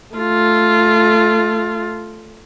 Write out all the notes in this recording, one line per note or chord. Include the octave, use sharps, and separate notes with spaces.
A3 F4